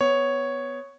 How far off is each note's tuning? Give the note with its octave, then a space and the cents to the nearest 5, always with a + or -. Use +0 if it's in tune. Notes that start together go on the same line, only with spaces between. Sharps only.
B3 +10 C#5 +0